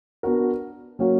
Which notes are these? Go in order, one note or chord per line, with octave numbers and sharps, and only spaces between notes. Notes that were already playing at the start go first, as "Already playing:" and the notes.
B3 D4 F#4 A#4
F#3 A#3 C#4 F#4